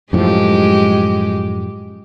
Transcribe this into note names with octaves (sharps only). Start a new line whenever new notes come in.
F#2 A2 F3 G#3 G4